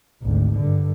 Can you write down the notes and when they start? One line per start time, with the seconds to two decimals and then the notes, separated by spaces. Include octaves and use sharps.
0.22 G#1 D2
0.57 G2 D3